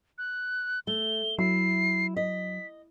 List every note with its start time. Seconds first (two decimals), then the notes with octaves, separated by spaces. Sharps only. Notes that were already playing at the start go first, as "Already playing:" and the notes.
0.18 F#6
0.87 A3 G7
1.39 F#3 E4 C7
2.17 D#5 B6